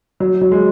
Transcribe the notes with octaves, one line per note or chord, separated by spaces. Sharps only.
F#3
F#3
G#3